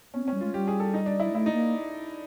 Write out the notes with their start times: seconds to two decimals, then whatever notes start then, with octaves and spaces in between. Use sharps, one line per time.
0.14 B3 C#4
0.24 C4 C#4
0.34 G3
0.41 G#3 F4
0.54 G3 G4
0.68 G#4
0.80 A4
0.94 D#4
1.06 D4
1.20 E4
1.32 A3 E4
1.46 D#4
1.53 A#3